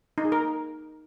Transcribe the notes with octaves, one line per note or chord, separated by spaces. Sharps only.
D#4
G#4
A#4